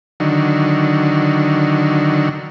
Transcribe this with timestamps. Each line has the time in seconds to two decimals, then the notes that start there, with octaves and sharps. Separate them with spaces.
0.20 D3 D#3 F#3